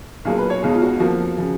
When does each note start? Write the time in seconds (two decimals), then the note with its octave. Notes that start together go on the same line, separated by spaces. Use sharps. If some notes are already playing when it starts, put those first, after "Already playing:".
0.25 B1 A#2 F#3 A#3 G#4
0.38 B4
0.50 C#5
0.62 B1 B2 G#3 G#4
0.74 F4
0.82 F#4
1.00 F2 F3 A#3 F#4
1.38 C#3 F3